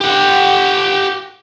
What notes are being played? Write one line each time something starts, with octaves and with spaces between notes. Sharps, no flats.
G4 F#5